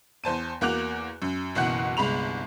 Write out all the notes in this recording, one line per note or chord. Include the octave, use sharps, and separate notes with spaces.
E2 C5 A5 D#7
E2 A#3 F#4 D6 F#6 F7
F#2
F#1 B1 B2 E3 F#5 F#6
G1 C2 G#3 B5 F7